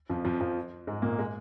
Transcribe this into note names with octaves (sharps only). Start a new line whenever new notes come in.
F2 F3
F2 F3
F2 F3
G#2 G#3
A#2 A#3
G#3